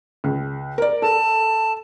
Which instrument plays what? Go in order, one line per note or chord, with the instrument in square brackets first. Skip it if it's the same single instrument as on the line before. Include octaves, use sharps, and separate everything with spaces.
[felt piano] C#2
A#4 D5
[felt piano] A4 [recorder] A5